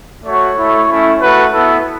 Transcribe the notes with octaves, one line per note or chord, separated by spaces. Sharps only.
A3 F#4 C#5
A3 E4
A3 C#4 E4
A3 F#4 B4
B3 E4 A4